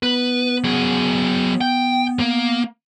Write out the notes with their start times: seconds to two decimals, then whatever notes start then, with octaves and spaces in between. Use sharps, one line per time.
0.03 B3 B4
0.64 F#3 G#4
1.61 G5
2.20 A#3